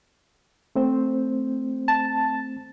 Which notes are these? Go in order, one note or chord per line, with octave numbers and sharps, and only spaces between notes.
A3 C4 C5
A5